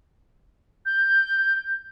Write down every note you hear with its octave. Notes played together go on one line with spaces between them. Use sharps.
G6